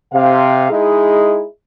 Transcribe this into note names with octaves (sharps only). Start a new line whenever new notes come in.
C3 F5
G#3 D#4 E4 G#4